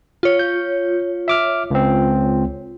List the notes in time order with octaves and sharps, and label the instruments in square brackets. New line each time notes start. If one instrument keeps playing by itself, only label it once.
[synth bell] F4 C#5
[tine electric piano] G6
E5 D6 F6
C#2 C4